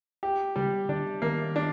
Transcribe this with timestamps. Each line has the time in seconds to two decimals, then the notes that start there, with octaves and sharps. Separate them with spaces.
0.23 G4
0.56 C#3 G3
0.89 D3 D4
1.22 D#3 A#3
1.56 D4